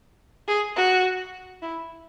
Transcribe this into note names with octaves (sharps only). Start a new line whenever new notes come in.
G#4
F#4
E4